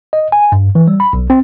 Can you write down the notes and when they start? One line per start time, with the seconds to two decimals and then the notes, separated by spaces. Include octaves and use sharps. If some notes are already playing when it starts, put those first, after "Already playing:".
0.13 D#5
0.32 G#5
0.52 G2
0.75 E3
0.88 G3
1.00 B5
1.13 B1
1.30 C4